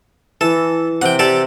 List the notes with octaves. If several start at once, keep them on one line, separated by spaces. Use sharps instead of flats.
E3 A4
C3 F#5 G5
G4 A4 D5